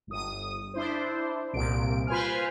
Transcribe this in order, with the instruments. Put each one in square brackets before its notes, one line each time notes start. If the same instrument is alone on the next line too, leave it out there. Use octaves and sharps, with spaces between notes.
[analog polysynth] G1 D#6
D4 E4 C5
C2 A#2 D7
F4 B4 C5 G#5 F6